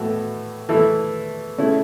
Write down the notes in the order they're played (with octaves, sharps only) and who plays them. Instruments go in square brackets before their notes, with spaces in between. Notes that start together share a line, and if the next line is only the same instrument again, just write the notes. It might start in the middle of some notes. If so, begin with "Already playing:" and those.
Already playing: [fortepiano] A2 E3 B3 F#4 A4
E3 A3 E4 A4
C#3 A3 C#4 E4